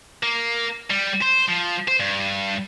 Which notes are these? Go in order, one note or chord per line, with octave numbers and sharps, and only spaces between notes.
A#3
G3
C5
F3
C5
G2